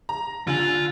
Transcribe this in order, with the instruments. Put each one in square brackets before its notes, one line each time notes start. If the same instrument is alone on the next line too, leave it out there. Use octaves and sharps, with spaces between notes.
[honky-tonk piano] A#5
[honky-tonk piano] D3 G#5 F#7 [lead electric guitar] F4